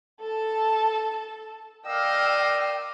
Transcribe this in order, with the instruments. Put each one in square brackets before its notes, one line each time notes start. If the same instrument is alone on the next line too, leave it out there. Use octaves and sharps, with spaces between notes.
[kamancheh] A4 A5
[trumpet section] A#4 D#5 F5 [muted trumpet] D5 [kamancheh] G5 E6